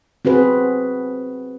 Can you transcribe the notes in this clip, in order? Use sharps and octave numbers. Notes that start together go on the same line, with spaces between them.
C4 F#4 G#4 B4